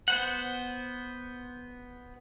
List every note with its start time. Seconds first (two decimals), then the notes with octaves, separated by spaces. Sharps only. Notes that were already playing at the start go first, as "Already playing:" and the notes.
0.08 B3 C5 F#5